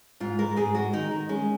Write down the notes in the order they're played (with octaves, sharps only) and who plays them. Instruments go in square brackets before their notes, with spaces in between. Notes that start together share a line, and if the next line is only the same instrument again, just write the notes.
[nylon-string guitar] G#2 F4
G#3 A#4
G#2 G#4
G#3 F#4
D#3 D#4
D#3
G#3 C#4